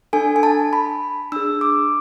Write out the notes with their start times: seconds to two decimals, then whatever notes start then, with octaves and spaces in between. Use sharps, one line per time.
0.13 D4 A4 G#5
0.36 G#5
0.43 A5
0.73 B5
1.32 D4 G#4 E6
1.61 D6